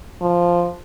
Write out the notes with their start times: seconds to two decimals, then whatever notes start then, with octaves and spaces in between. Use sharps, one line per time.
0.22 F3